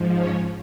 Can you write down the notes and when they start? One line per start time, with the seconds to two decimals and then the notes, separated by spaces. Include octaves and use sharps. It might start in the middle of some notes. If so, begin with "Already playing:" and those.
Already playing: G#2 F3
0.19 C#4 C#5